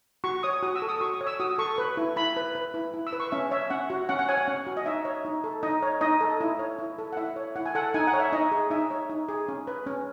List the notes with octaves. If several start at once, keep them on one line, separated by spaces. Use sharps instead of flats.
F#4 C#6
C#5 D#6
F#4 D#6
E6
A4
D#6
F#4 C#6
D#6
C#5
E6
F#4 D#6
A4 C#6
B4
E4
E4 B5
B4
B4
E4
E4
E6
B4
C#6
C#4 E5
C#5 E5
C#4 F#5
F#4
C#4 F#5
F#5
C#5 G#5
F#5
C#4
F#4
D#5
D#4 E5
C#5
D#4
A4
D#4 D#5
C#5
D#4 D#5
A4
E4
C#5
E4
A4
F#5
E4 E5
C#5
E4 F#5
G#5
A4 F#5
D#4 G#5
F#5
C#5
E5
D#4 D#5
G#4
D#4 E5
C#5
D#4
G#4
C#4
B4
C#4